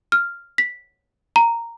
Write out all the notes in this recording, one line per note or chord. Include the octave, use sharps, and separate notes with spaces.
F6
B6
A#5